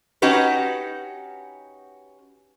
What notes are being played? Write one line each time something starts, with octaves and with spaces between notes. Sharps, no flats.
C#4 D#4 F#4 G4 B4